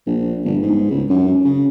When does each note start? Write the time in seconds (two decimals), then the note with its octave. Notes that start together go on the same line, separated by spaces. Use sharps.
0.06 A#1
0.45 G1
0.62 G#2
0.91 C#2
1.10 F#2
1.45 C#3